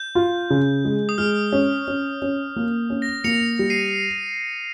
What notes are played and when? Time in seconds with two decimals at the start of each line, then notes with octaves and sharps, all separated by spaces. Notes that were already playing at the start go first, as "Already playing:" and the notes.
Already playing: G6
0.15 F4
0.50 C#3
0.85 G#3
1.09 D#6
1.18 G#3 F6
1.53 C#4
1.88 C#4
2.22 C#4
2.56 A#3
2.90 C#4
3.02 A#6
3.24 A#3 C#7 F7
3.59 G3
3.70 C7 D#7